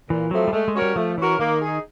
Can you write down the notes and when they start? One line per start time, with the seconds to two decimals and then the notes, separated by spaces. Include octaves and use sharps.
0.09 A#2 E3
0.31 F3 F#3 A3 C4
0.48 G3
0.53 G#3 A3
0.68 G#3
0.75 C#4 F#4 A#4 C#5
0.82 G3
0.96 F3 A3
1.18 E3 C#4 F#4 A#4 C#5
1.39 D#3 A#3
1.61 D#4 G#4